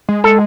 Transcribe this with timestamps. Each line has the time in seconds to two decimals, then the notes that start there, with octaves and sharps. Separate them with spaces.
0.09 G#3
0.24 G#3 A4